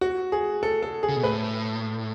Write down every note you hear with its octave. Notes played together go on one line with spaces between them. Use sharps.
F#4
G#4
A4
A4
G#4
C#3
B2
A2 B4